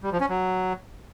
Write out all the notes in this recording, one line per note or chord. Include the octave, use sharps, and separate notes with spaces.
G3
F3
C#4
F#3